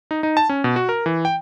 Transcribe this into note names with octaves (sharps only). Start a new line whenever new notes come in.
D#4
D#4
A5
C#4
B2
F#4
A#4
E3
G5